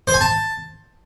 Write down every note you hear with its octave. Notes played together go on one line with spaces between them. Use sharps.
C5
G#5
A5